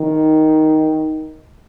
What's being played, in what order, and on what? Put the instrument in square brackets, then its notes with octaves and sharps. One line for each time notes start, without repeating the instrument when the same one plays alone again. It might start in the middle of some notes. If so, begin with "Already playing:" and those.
Already playing: [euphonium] D#3